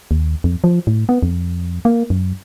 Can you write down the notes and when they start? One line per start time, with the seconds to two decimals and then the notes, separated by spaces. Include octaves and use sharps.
0.11 D#2
0.44 F2
0.64 F3
0.87 A2
1.09 B3
1.23 F2
1.85 A#3
2.10 F#2